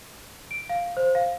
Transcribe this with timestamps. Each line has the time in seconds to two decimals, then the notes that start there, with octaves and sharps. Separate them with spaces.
0.51 D7
0.69 F5
0.97 C5
1.15 F5